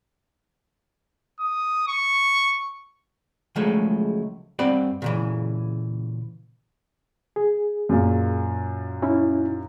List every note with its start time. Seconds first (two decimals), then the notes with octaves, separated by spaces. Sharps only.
1.40 D#6
1.88 C#6
3.56 C#2 F3 F#3 G#3 A3
4.59 G2 C4 D5 F#5 B5
5.02 A#2 C#3 E3
7.36 G#4
7.89 F#2 A#2
9.02 C#4 D#4 E4